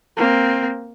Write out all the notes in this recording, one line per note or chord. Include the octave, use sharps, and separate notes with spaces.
A#3 C4